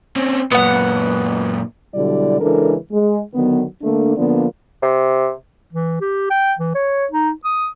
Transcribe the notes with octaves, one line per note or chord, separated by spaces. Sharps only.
C4 C#4
F#2 A#2 B3 F#5
B2 D3 F#3 G3 E4 D5
C#3 E3 G#3 D4 A4 A#4
G#3
D3 D#3 F#3 B3
D3 A3 A#3 D4
D3 F3 A#3 B3 D4
C3
E3
G4
G5
E3
C#5
D#4
D#6